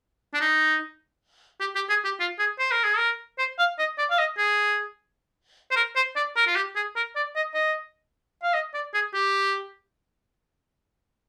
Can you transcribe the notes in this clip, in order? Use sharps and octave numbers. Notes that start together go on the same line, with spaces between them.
D4
D#4
G4
G4
G#4
G4
F4
G#4
C5
A#4
G#4
A#4
C5
F5
D#5
D5
F5
D#5
G#4
C5
A#4
C5
D5
A#4
F4
G4
G#4
A#4
D5
D#5
D#5
F5
D#5
D5
G#4
G4